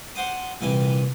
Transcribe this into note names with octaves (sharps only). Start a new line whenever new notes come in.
C5 F#5 G5 C6 D6 D#6
C2 A#2 E3 G5 G#5 D6